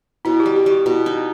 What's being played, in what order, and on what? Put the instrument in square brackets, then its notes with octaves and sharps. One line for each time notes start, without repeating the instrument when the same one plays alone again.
[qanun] B2 [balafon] E4
[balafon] G4
[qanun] G3
[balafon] G4
[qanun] G3 [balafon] F#4
[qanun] B2 [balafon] E4
[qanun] D#4